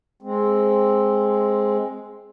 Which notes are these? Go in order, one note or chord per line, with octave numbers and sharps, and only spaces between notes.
G#3 C4